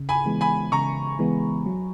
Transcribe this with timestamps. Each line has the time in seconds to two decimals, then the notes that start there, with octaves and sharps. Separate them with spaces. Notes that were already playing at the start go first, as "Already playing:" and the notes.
Already playing: C#3
0.09 G#5 B5
0.26 E3 G#3 B3
0.41 G#5 B5
0.72 C#3 A#5 C#6
1.19 E3 G#3 B3
1.66 F#3